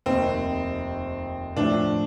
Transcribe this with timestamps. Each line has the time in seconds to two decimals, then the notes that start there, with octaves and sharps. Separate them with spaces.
0.06 F1 D#2 D#3 C4
1.56 A2 F3 A3 D4